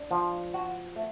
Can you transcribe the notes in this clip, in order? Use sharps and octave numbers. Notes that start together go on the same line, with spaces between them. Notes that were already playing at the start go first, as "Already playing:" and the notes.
Already playing: D4
F3
F#4
A3